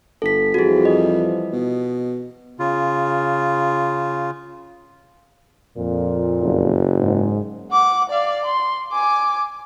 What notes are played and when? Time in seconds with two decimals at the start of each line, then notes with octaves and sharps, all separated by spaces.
0.22 G1 A4 B6
0.54 F2 E3 F3 G3 F#4 G#4
0.85 D#5
1.53 B2
2.59 C#3 F4
5.77 F2 A#2
6.41 F#1
7.00 G#2
7.71 F#5 D6
8.10 D5 F5
8.45 C6
8.92 G#5 D6